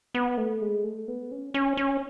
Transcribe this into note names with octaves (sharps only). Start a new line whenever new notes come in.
B3
A3
G#3
A3
B3
C#4
C#4
C#4